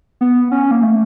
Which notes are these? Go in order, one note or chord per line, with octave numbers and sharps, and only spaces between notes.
B3
C#4
A#3
A3